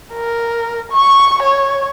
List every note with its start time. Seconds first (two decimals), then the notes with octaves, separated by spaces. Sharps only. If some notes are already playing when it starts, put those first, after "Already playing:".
0.14 A#4
0.92 C#6
1.43 C#5